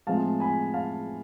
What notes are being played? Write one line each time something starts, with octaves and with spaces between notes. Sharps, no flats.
A2 F3 G#3 C4 F5 A5
G#5 B5
F5 A5